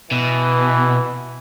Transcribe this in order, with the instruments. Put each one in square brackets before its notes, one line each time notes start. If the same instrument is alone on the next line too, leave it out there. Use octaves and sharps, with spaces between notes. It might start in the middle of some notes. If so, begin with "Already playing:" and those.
[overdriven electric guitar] B2 [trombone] E3